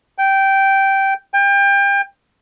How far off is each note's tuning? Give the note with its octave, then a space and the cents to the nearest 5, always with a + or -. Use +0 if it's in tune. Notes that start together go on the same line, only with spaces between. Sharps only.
G5 -10
G5 +30